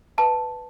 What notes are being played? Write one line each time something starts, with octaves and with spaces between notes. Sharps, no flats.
B4 E5 A5